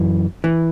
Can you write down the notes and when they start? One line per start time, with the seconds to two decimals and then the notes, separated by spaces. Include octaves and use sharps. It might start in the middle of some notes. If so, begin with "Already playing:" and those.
Already playing: F#2 E3
0.44 E3